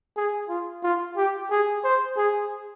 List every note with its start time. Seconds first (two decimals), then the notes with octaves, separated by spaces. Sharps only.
0.17 G#4
0.49 F4
0.84 F4
1.17 G4
1.51 G#4
1.85 C5
2.17 G#4